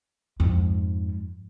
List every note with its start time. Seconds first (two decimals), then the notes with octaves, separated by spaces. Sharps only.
0.40 F2 G#2